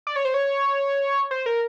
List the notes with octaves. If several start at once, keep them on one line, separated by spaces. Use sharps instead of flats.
D5
C#5
C5
C#5
C5
A#4